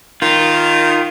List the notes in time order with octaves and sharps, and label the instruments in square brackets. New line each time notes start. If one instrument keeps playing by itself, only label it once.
[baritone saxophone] D#3 [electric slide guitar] F4